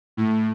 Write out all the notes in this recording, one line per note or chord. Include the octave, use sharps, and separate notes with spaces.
A2